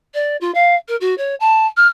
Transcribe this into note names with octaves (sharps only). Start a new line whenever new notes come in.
D5
F4
F5
A#4
F#4
C#5
A5
F6